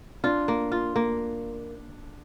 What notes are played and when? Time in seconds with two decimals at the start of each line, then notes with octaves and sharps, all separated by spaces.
0.24 D4 F4
0.48 A#3
0.72 F4
0.96 A#3